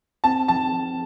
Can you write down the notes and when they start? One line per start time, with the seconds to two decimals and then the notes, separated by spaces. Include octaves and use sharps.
0.24 C4 A5
0.48 F3 A5